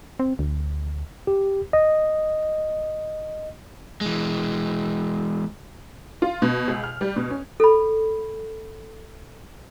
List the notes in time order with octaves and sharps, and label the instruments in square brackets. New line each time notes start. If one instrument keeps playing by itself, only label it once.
[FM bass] C4
D2
[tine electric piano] G4
D#5
[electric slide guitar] E3 G#3
[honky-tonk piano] F4
B2
C#2
F6
G3
B2
C#4
[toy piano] A4 B5